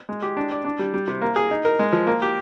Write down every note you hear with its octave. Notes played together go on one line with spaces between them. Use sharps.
G#3
G4
D4
D5
D4
G3
G3
C3
A#3
G#4
D#4
A#4
G#3
F3
A#3
G4